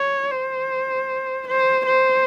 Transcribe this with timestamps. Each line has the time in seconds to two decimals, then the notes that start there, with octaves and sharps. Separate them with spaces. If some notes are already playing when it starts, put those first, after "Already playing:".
Already playing: C#5
0.32 C5
1.47 C5
1.85 C5